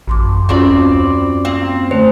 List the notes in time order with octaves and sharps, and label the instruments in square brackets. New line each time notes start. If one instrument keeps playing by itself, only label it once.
[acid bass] A1 [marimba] F#2 C6 D6
[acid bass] D#2 [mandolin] C4 D5 B5 [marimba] C#4 F4 F#4
[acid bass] A#3 [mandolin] C4
[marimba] D3 A3 [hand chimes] C5